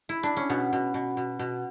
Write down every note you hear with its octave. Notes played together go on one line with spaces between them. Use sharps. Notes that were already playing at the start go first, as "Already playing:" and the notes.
Already playing: F#4
E4
D4
C#4
B2 B3
B2
B2
B2
B2